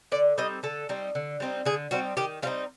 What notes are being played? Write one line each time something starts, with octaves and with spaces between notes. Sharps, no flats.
D3 D5
G3 C4 D#4 D#5
D3 A4
G3 C4 D#4
D3
G3 C4 D#4
D3 G#4
G3 C4 D#4 F#4
D#3 G4
G3 C4 D#4 F4